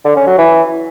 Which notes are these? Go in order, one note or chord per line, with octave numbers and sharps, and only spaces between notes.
D3
C#4
F#3
E3